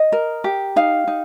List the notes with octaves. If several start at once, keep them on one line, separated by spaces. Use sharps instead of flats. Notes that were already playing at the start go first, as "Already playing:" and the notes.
Already playing: D#5
A#4
G4
D#4 F5
D#4